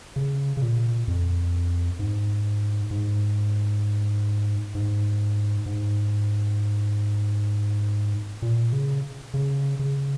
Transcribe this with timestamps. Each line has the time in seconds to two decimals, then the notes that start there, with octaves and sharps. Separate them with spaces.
0.16 C#3
0.57 C#3
0.62 A#2
1.08 F2
1.99 G#2
2.91 G#2
4.75 G#2
5.66 G#2
8.42 A#2
8.73 C#3
9.34 C#3
9.79 C#3